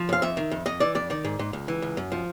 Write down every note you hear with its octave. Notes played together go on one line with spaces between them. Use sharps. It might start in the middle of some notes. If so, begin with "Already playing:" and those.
Already playing: F3
F#2 F5
F2 E5
D#3
F2
F2 D#5
E3 D5
F2 D5
D#3 D5
G#2
G#2
C#2
E3
C#2
F#2
F3